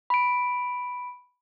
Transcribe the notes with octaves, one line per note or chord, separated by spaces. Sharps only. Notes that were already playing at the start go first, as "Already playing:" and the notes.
B5 D7